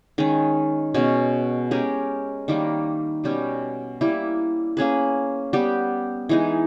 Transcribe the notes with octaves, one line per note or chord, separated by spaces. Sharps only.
D#3 G#3 C#4
B2 G#3 C#4
G#3 C#4 G4 A#4
D#3 G3 A#3
B2 G3 C#4 G4
G3 A#3 E4
A#3 C#4 G#4 B4
G3 B3 G4
E3 G#3 D#4